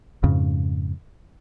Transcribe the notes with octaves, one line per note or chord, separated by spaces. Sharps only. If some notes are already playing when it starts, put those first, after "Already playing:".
F2 G#2 C#3